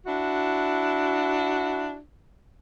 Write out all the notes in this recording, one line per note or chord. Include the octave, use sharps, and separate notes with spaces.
D4 E4 F#4